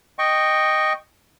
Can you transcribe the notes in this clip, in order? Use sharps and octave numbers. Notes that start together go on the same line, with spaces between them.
D#5 G5 C#6